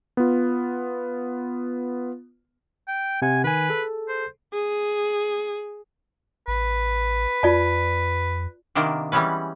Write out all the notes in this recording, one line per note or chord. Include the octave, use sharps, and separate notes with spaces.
B3 F4
G5
C3 F#5 G#5
D#3 B4 G#5
G#4 A4
C5
G#4
A1 B4
F2 F4 D5 A5
C3 D#3 A#3 B3 D4
E3 G3 G#3 B3 C#4 B4